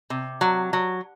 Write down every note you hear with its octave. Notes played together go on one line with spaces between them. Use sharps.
C3
F#3
F#3